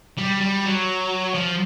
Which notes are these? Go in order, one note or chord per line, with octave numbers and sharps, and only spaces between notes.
G3
G3
F#3
F3